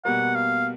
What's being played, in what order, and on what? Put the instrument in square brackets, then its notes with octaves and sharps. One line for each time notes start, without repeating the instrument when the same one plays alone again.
[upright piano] B2 G3 A#3 [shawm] F#5
[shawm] F5